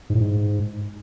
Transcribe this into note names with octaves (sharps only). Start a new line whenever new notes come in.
G#2
A2
G#2